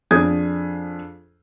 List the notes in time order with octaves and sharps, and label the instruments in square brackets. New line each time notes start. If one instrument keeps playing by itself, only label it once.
[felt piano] F2 D4 G#4 D#6 G#6